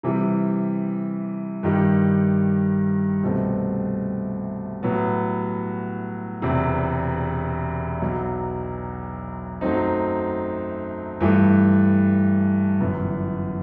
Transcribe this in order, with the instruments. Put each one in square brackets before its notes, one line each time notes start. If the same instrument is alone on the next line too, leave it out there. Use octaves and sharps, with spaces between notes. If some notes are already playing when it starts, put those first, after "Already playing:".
[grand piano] C3 E3 G3
G2 D#3 G3
C2 B2 A3 C4
A2 F#3 B3
E1 E2 C3
B1 B2 F#3
F#2 F#3 A3 C4 D#4
G2 E3 A3
G1 F#2 E3 B3